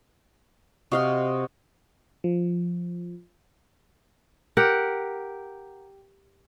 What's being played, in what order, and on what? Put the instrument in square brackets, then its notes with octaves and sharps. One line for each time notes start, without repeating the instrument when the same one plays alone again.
[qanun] C3 F5 C6 [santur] F#4 D#5
[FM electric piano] F3
[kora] G4 A#4 F#5